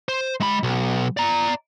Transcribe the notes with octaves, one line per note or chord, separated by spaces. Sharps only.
C5
G#3 B5
B1
D5 A#5